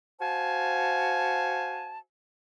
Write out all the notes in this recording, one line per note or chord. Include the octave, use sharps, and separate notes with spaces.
F#4 C5 F5 G#5 A5